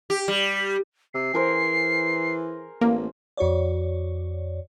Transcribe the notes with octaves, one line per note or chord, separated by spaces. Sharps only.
G4
G3
C3 C7
E3 G#4 A#4 C5
A1 A#3
F2 F#4 C#5 D5